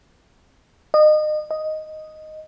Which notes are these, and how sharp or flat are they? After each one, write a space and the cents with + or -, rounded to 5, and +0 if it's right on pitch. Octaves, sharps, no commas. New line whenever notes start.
D#5 -30
D#5 +0